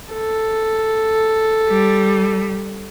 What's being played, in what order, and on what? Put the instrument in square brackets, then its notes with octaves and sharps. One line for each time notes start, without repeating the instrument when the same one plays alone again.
[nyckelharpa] A4
[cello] G3